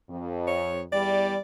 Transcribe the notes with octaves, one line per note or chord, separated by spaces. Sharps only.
F2
C#5
E2 G3 D5